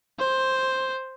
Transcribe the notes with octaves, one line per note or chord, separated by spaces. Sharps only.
C5